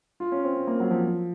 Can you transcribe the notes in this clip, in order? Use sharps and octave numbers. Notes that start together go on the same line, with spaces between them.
F4
C#4
C4
C4
A#3
F#3
F3